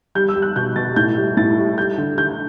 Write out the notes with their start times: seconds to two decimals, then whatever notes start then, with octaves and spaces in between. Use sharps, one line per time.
0.15 G3 G6
0.29 E6
0.35 G3
0.42 F#6
0.56 B2 G6
0.76 B2 A6
0.96 A2 G6
1.17 G3
1.37 A2 A6
1.57 G3
1.77 G3 G6
1.98 D3
2.18 D3 G6